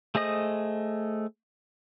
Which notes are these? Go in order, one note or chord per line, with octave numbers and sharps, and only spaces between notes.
A3 G#4 C5 D#5 D#6